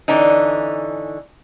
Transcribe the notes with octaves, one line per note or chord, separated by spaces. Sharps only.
D3 E3 C#4 D#4